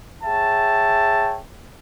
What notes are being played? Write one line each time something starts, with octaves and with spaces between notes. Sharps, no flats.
G#4 C#5 E5 G5 A5